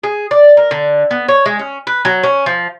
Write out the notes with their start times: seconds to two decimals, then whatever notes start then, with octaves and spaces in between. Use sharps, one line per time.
0.03 G#4
0.31 D5
0.57 A#4
0.71 D3
1.11 B3
1.28 C#5
1.46 G#3
1.59 C#4
1.87 B4
2.05 F#3
2.23 C#4
2.46 F3